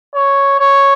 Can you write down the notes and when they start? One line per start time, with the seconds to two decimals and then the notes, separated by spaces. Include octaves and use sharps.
0.15 C#5
0.59 C#5